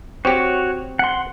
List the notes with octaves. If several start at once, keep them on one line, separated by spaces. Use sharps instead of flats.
C4 F#4 G4 C#5
F#5 C6